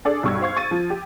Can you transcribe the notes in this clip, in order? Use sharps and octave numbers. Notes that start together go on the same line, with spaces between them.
D4 G#4 A4 D5
B1 G2 C#6 E6 G#6
C5 F5 C#6 G#6
C#6 A6 D#7
F3
G4